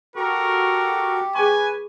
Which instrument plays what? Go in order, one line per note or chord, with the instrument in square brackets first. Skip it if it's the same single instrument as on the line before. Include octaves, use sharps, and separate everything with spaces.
[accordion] F#4 A4 C#6 [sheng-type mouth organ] G4 [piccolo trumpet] A#4
[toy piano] G#4 C#6 [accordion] B4 [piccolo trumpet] G#5